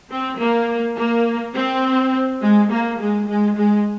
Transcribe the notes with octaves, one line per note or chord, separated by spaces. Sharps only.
C4
A#3
A#3
C4
G#3
A#3
G#3
G#3
G#3